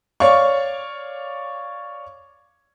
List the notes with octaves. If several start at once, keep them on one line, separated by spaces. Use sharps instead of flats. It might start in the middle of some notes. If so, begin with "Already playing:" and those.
C#5 D5 F5 C#6